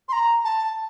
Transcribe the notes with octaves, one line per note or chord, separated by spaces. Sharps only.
C6
A#5
A5